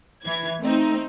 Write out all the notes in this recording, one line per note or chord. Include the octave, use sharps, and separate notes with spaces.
E3 G#6
A3 C4 D#4